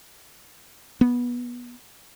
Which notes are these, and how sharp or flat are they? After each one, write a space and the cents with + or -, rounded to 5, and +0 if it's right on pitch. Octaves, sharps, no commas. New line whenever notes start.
B3 -20